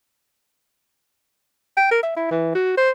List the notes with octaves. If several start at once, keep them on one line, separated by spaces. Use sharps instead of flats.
G5
A#4
E5
E4
E3
F#4
C5